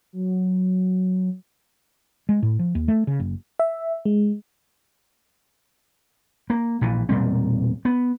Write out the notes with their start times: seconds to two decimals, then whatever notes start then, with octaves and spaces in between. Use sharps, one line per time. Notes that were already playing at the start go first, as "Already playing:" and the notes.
0.13 F#3
2.29 G#3
2.42 A2
2.59 F3
2.75 D#2
2.88 A3
3.07 C#3
3.20 F#1
3.59 E5
4.05 G#3
6.50 A#3
6.81 A#1 A#2 E3
7.09 E1 A#2 G3 C4
7.85 B3